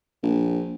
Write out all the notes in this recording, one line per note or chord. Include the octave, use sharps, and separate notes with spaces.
A#1